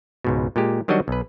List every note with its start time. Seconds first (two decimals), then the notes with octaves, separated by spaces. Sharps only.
0.24 C#2 G#2 B2
0.56 A#2 G#3 G4
0.88 D#3 F#3 G3 D4 F#4 D#5
1.08 B1 B4